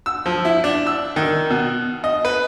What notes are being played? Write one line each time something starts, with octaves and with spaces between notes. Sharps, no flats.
E6
F3
E4
D4
E6
D#3
B2
D#5
B4